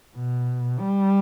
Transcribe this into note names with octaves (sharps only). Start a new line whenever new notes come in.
B2
G3